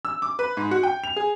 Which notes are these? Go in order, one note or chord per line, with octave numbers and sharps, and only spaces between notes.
E6
D6
B4
G#2
F#4
G5
F7
G#4